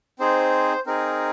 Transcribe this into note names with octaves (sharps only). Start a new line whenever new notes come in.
C4 D#4 G#4 C5
C4 D#4 G#4 A#4